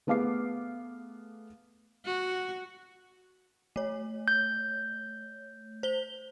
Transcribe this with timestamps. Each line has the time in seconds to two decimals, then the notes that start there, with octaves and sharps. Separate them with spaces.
0.07 A3 B3 G#4 F5 D6 C7
2.05 F#4
3.76 A3 C#5
4.28 G6
5.83 C5 G7